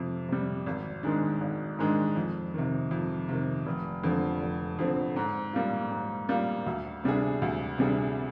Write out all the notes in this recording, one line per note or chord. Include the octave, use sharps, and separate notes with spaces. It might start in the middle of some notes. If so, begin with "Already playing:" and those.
Already playing: F2 C3
C3 G3
G#1
G#2 D#3 G#3 D4
G#1
G#2 D#3 G#3 D4
F2
C3 D#3
F2
C3 D#3
F1
F2 D3 F3 C4
F1
F2 D3 F3 C4
G#2
G3 A#3 F4
G#2
G3 A#3 F4
D2
C3 G3 D4 G#4
D2
C3 G3 D4 G#4